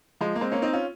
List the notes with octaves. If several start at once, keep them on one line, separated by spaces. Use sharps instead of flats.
F3 G#3
A#3
G#3 C4
A#3 C#4
C4 D#4
C#4 F4